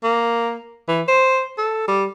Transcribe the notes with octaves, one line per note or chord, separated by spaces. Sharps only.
A#3
E3
C5
A4
G3